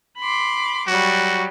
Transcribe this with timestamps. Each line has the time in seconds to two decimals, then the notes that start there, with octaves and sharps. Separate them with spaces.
0.18 B5 C6 D6
0.87 F#3 G3 F#4